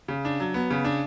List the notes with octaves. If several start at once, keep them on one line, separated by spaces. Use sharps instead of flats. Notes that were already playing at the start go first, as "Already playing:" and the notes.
C#3
D4
F#3
B3
C#3
D4